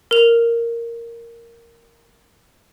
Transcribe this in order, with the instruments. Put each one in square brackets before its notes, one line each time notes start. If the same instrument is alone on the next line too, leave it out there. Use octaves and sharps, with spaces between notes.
[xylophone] A#4 F7